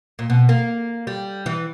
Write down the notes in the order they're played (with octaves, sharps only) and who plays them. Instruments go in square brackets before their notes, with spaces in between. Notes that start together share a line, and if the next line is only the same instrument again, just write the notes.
[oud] A#2
B2
A#3
G3
E3